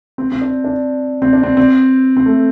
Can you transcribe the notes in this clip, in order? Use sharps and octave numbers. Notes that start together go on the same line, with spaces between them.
C4
C4
D4
D4
C4
D4
C4
C4
C4
A3